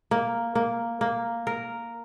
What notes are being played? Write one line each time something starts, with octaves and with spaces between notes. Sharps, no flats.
A#3
A#3
A#3
A#4